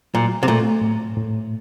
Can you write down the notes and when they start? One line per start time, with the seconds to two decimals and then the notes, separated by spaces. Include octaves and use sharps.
0.14 A#2 F#3
0.43 C3
0.48 A#2 A3
0.81 A2
1.16 A2